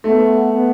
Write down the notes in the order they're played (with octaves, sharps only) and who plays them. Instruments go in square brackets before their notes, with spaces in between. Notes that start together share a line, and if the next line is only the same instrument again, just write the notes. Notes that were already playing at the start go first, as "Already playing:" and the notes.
[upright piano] A3 [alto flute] B3
[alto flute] B3